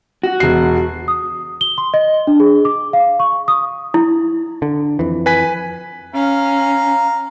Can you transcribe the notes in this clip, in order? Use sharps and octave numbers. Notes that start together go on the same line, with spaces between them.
F#4
E1 C7
D#6
G7
C6
D#5
D4
G#4
D6
F5
C#6
D#6
E4
D3
F2 E3
B4 G#5 B6
C#4 F5 A#5